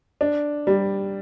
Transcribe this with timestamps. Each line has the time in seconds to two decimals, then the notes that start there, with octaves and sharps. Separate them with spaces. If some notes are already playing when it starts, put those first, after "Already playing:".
0.21 D4
0.67 G3